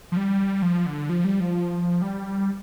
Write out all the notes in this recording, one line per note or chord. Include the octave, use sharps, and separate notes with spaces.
F3
G3
F3
D3
F3
G3
F3
G3